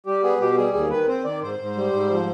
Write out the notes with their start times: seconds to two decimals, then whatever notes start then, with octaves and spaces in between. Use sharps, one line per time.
0.06 G3 G4
0.23 B3 G#4
0.40 B2 G4
0.57 G3 G#4
0.73 D#2 G#4
0.90 D#3 B4
1.08 C4 C5
1.24 D#3 D5
1.42 G#2 C5
1.59 G#2
1.75 G3
1.92 G#2
2.10 F3